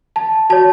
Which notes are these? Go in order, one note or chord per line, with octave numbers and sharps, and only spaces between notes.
A5
F#4 C#5 A5